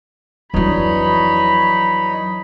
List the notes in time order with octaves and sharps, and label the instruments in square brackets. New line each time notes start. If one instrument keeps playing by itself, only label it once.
[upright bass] F2 F#3 [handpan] E3 D4 [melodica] D#4 C#5 D#5 [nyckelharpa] B5